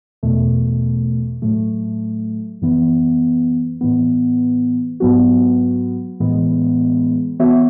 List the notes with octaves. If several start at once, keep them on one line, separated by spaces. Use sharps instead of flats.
E2 B2 A3
A2 F#3 A3
F#2 E3 B3
A2 E3 B3
G#2 F#3 B3 F#4
A2 E3 G#3 B3
E3 B3 F#4 C#5 E5